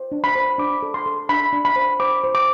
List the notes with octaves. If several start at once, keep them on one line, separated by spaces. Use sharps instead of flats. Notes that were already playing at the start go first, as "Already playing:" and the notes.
Already playing: C5
D4
B5
C5
D4 D6
A4
C6
A4
D4 B5
D4
B5
C5
C5 D6
C5
D6